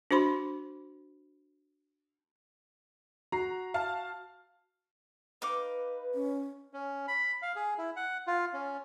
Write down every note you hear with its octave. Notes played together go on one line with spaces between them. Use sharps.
D4 F#4 C5 B5 C6
F#4 A#5 C7
F5 A5
D#4 B4 F5 D6
C#4
C#4
B5
F5
G#4
E4
F#5
F4
C#4